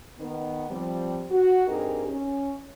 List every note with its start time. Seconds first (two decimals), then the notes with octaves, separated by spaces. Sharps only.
0.19 D#3 B3
0.70 F3 G3 C4
1.30 F#4
1.67 G2 C4 D#4 G4 G#4 A#4
2.08 C#4